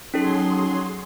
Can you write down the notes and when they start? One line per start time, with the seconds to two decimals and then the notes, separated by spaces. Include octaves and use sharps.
0.14 F#3 C#4 D#4 G#4 A4 C6